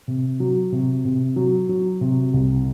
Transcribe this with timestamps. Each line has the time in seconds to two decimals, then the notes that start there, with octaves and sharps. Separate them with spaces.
0.08 C3
0.40 F#3
0.72 C3
1.05 C3
1.36 F#3
1.69 F#3
2.01 C3
2.34 C2